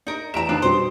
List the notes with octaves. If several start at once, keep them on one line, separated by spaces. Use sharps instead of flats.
D4 D#4 A#4
E2 E5 A#5 D7 E7
F2 D3 D#3 D4 F4 B4
B2 G3 C5